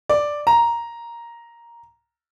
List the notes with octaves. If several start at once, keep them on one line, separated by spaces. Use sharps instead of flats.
D5
A#5